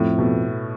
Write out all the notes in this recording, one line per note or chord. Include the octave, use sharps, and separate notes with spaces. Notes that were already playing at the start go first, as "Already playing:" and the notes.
Already playing: F2 A2
B2